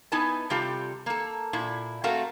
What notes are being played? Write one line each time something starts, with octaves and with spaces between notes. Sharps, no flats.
B3 D#4 E4 G#5 A5
C3 G3 F4 G4 A4
A#3 A4
A#2 E4
A3 C4 F#4 A#4 F5